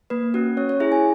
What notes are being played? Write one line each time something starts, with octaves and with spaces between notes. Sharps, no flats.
A#3 B4
C#4 F#4
C#4 C#5
C#5
E4 G#4 E5
G#5